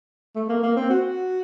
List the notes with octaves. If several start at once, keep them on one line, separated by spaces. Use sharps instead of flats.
A3
A#3
A#3
C4
F#4